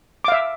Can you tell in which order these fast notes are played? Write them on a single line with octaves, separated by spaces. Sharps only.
D6 F5 E5